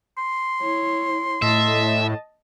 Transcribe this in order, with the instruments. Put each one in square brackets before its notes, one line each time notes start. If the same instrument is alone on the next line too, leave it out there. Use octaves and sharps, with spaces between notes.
[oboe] C6
[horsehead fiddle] E4 C#5
[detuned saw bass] A2 [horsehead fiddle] D#5 A5 [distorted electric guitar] E5